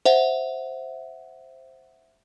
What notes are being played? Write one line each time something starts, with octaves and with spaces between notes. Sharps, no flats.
C5 E5 F#5